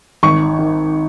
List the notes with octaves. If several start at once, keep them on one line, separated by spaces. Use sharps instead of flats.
G#1 C#6
D#3